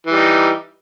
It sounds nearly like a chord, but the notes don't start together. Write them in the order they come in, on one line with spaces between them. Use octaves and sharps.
E3 G3 D#4